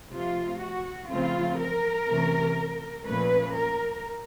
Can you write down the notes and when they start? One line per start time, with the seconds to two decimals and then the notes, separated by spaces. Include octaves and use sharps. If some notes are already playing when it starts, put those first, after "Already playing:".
0.12 C3 F3 A3 F4
0.61 F#4
1.10 C#3 F3 A3 C4 F4
1.59 A#4
2.08 C3 E3 A3 C#4
3.05 A#2 F3 A3 C#4 B4
3.55 A#4